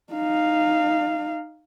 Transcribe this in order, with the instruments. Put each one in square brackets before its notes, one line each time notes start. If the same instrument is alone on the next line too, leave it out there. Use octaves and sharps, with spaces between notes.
[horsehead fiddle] D#4 F5